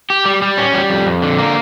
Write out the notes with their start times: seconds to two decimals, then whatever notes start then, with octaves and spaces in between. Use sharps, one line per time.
0.10 G4
0.25 G3
0.42 G3
0.58 C#4
0.73 G3
0.90 F2
1.06 F2
1.22 D3
1.39 A#3